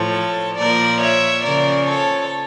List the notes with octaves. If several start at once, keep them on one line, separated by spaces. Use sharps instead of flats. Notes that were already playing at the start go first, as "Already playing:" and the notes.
Already playing: A2 F3 A4 C#5
A#2 F3 A#4 D5
C#5 E5
C#3 F3 A#4 D5
A4 C#5